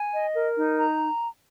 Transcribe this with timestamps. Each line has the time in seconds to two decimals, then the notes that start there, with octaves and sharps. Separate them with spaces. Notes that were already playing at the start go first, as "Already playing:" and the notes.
Already playing: G#5
0.13 D#5
0.35 A#4
0.56 D#4
0.78 A#5